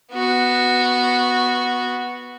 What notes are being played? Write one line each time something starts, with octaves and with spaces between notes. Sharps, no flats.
B3 F#4